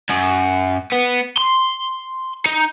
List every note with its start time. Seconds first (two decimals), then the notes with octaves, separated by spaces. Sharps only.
0.09 F#2
0.92 B3
1.37 C6
2.46 D#4